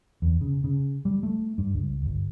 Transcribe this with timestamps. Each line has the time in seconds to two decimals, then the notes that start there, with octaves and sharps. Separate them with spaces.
0.22 E2
0.41 C#3
0.64 C#3
1.05 G3
1.23 A3
1.58 G2
1.74 C#2
2.06 G1